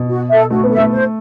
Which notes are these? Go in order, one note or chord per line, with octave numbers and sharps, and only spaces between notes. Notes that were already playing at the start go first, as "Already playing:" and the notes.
Already playing: B2
F#4
A4 E5
A3 F#4
B3
A4 E5
A3
C5